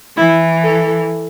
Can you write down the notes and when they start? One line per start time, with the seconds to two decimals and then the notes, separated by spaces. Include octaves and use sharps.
0.17 E3 E4
0.62 A4